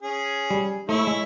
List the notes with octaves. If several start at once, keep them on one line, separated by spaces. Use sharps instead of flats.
C#4 G#4
G3
A3 E4 C#5 E5
G#3